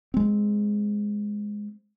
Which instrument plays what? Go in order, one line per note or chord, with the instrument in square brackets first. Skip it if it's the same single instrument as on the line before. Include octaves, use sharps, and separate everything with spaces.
[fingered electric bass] G#3 C4